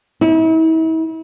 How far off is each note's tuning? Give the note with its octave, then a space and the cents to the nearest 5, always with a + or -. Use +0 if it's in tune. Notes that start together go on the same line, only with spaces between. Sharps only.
E4 -40